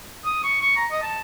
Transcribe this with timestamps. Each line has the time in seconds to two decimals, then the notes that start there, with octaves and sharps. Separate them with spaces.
0.25 D#6
0.43 C#6
0.61 C#6
0.76 A#5
0.91 D#5
1.02 A5